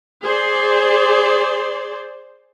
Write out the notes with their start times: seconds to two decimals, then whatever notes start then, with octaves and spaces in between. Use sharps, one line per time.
0.24 G#4 C5 D5